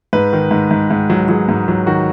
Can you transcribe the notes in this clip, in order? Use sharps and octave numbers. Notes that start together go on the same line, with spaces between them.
G#2 B4
D#3
G#2
G#2
G#2
F#3
F#3 G#4
G#2
F#3
D#3 F#4